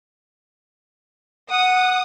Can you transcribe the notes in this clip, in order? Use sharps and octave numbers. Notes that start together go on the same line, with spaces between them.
F#5 D#6